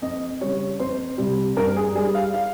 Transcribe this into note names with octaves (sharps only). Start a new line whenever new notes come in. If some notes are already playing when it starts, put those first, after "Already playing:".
F2 D#5
C#3 G3 C#5
F2 C5
C3 G3
G2 A#4
G#4
G3 G#4
F5
F5